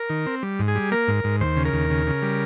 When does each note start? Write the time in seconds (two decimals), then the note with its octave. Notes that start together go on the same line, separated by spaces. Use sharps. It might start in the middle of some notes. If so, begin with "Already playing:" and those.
Already playing: A#4
0.09 D#3
0.26 C4
0.43 G3
0.59 G#2
0.68 G#4
0.76 G3
0.92 A#3 A#4
1.08 G#2
1.24 G#2
1.41 D#2 C5
1.57 C#3
1.65 A#4
1.73 D#2
1.90 C#3
2.07 C#3
2.22 G3